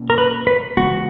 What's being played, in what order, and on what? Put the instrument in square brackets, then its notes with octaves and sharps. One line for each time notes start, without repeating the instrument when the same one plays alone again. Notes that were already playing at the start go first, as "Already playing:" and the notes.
Already playing: [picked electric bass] B2 A#3 C#4
[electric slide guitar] A#4
B4
B4
[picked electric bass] C#3 E3 G#3 B3 [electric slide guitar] F#4